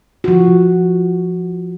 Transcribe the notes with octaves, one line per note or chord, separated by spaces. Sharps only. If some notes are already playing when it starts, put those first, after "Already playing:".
F3 F#4